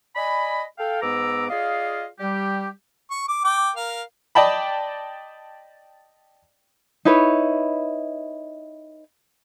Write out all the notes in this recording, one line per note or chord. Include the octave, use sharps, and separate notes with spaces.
D5 D#5 G#5 B5
A4 F5 G5
G#2 B3 B4 A#5 D6 E6
F4 G#4 D5 D#5 F5
G3 G4
C#6
D6
G5 D6
A#4 F5
D5 D#5 G5 A5 B5
D#4 E4 B4 C#5